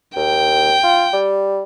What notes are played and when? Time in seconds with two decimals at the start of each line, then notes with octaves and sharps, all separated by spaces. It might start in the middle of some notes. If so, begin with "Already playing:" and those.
0.16 D#2 G5
0.84 F4
1.13 G3